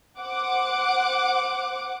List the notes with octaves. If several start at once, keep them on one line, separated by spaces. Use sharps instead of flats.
C5 F#5 D6